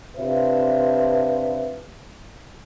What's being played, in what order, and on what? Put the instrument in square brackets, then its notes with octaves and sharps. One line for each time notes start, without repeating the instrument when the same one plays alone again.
[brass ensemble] C3 D4 F4 B4 C5 E5